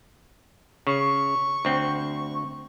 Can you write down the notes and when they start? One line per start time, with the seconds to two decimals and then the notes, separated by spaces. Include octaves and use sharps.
0.87 C#3 C#6
1.65 D2 C4